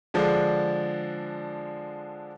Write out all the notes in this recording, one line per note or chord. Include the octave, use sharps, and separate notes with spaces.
D3 F3 G#3 D4